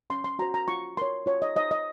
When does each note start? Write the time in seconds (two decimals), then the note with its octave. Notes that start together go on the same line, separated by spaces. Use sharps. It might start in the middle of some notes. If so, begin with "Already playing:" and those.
0.10 C#4 C6
0.24 C6
0.39 F#4 C5 A#5
0.54 A#5
0.68 F4 C#6
0.97 A#4 C#5 C6
1.26 F4 C#5
1.42 D#5
1.56 C5 D#5
1.71 D#5